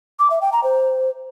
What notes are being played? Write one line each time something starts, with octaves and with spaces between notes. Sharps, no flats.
D6
E5
G5
A#5
C5